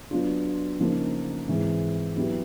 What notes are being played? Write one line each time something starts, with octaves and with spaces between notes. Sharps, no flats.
F#3 B3 D4 F4
C#3 F3 A#3 D#4
G#2 E3 G#3 C4
F#3 B3 E4 G4